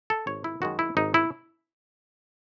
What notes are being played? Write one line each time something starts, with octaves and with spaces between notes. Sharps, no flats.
A4
G#1 C#5
E4
F#2 D#3 G#3 F#4
E4
G#1 D#4
E4